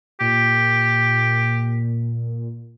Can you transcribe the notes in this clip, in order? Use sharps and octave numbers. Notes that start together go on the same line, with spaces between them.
A#2 G4